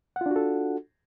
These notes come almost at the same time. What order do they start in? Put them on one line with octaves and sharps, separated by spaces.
F#5 F4 D4 F#4 A4